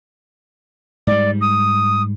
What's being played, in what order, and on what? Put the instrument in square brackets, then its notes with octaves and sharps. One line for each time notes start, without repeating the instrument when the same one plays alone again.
[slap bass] G#2 G3 [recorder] D5
[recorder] D#6